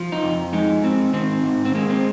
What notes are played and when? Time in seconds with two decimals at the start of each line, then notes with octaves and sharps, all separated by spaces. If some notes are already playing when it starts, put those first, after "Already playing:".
Already playing: F3
0.12 D#4
0.22 F2
0.53 G#3 D#4
0.83 G#2 C4
1.13 D#3 C4
1.44 G#2
1.65 C4
1.75 G#3 A#3
1.89 C4